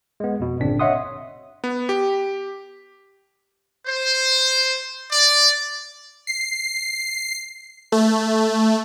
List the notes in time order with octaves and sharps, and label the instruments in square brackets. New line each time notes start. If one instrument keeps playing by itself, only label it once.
[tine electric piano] G#3 B3
F2 B2
G1 A#2 C#3 C4 D4 B6
C#5 D#5 E5 F#5 C6 D#6
[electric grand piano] B3
G4
[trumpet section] C5
D5
[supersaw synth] C7
A3